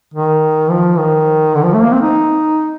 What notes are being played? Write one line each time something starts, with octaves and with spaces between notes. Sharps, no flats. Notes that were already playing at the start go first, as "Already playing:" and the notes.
D#3
F3
D#3
D3
F3
A3
A#3
C4
D#4